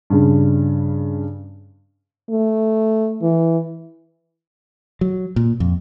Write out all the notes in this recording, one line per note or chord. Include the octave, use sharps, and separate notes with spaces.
G2 C#3
A3
E3
F#3
A#2
F2